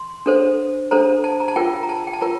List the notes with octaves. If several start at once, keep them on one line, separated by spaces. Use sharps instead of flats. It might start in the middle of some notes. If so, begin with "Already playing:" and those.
Already playing: C6
D4 A4 C5
D4 A4 C5 A#5
A5
A#5
A5
F4 A#4 G5
A#5
A5
G5
A5
F4 A#4 A#5